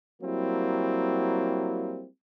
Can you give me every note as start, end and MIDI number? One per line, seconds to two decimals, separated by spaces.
0.23 2.06 54
0.23 2.06 55
0.23 2.06 58
0.23 2.06 60
0.23 2.06 64